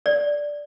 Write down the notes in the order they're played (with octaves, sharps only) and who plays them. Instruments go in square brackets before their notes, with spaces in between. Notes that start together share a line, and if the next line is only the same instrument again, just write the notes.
[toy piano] D5